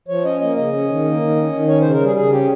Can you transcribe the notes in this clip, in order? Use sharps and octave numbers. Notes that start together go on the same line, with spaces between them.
F3 C#5
C#4 D#5
A#3 D#5
C#3 D#5
C#4
D#3
A#3
D#3
C#4
D#3
C#4 C#5
C#3 C5
A#4
G3 G#4
C#3 G#4
C#4 G4